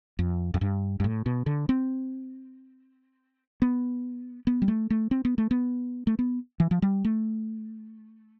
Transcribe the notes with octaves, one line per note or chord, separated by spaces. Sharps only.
F2
F2
G2
G2
A2
B2
D3
C4
B3
B3
G3
A3
A3
C4
B3
A3
B3
A3
B3
E3
F3
G3
A3